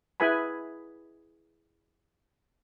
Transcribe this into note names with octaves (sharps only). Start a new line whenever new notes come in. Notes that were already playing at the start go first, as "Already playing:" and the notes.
E4 G#4 B4 G#5 B5